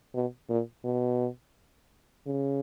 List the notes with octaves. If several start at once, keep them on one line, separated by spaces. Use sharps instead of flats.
B2
A#2
B2
C#3